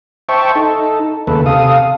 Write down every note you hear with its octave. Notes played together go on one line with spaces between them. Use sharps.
C5 E5 G5 A5 C#6
D#4 A4
D#2 C#3 A3 A4 B4
C3 A4 F5 D#6